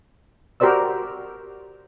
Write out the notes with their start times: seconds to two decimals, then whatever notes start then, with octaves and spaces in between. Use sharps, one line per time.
0.60 F#4 G4 A#4 C5 D5 E6